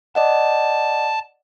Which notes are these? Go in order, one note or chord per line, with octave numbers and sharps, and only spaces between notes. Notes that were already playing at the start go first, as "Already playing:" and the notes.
D5 D#5 F#5 A5